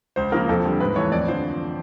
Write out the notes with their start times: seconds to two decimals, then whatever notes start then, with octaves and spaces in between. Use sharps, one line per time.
0.16 C#2 C5
0.32 C#3 F3 A#3 A#4
0.49 F2 A4
0.64 D3 G3
0.80 G#2 B4
0.96 E3 A3 C#5
1.12 F2 D5
1.28 D3 F3 C5